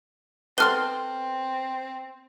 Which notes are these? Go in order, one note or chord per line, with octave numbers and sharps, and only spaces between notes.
B3 C4 A4 C6 F6 G7